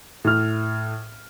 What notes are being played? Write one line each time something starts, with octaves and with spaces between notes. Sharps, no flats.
A2 F6